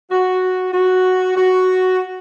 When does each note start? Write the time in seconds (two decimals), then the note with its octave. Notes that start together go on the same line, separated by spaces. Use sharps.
0.11 F#4
0.74 F#4
1.37 F#4